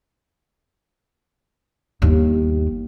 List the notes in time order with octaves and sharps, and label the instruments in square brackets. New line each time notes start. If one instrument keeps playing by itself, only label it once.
[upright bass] G1 D#2